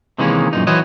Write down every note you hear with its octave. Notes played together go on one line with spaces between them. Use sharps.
C3 D#3 E3 G#3 A#3 C#4
F#2 A#2 D#4
E3 E4 F#4 C5 C#5 D#5